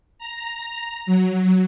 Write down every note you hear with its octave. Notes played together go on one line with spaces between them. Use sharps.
A#5
F#3